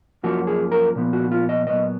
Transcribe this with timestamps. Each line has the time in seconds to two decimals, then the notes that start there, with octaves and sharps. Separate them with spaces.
0.23 F#2 F3 A#3 C#4 F#4
0.47 G#4
0.72 A#4
0.95 A#2 F3 B3
1.13 F#4
1.32 F4
1.49 D#5
1.67 A#2 F#3 B3 D#5